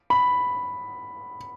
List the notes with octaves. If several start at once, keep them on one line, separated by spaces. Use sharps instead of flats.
B5